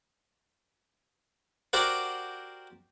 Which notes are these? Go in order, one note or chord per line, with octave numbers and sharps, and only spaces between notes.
F#4 G4 A#4 C5 D5 F#5